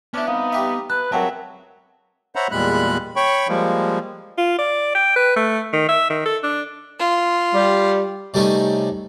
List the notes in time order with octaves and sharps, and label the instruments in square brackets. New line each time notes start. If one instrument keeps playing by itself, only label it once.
[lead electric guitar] B3 [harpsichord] C#4 E4 [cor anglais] D4
[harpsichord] C2 [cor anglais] D#4 [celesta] F5
[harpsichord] G3 G4 E5
[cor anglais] B4 [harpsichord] A5 [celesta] F#6
[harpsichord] C#2 G2 C4 [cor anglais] F#3 [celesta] A#4 F#5 A5 [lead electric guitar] E5
[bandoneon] C5 C#5 E5 F#5 A#5 B5
E2 A#2 G3 G#3 B5 F#6
C#5 G5 B5 C#6
F3 G3 G#3 A#3
[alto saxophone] F4
D5
G5
B4
A3
D#3
E5
D#3
A4
D4
[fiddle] F4
[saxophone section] G3
[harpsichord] C3 G3 A3 C#4 D#4